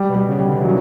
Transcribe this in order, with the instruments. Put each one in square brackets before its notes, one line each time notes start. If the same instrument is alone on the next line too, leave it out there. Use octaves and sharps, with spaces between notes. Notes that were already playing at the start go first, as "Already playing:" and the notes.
Already playing: [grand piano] G3
[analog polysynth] B2
[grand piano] G3
[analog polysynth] C#3
[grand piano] G3
[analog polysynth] D3
E3
[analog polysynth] D#3 [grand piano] F#3